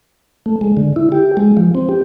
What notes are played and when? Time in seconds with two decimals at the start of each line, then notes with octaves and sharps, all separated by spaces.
0.46 A3
0.61 G#3
0.77 D3
0.96 E4
1.12 G4
1.37 G#3
1.57 F3
1.75 C4
1.89 G4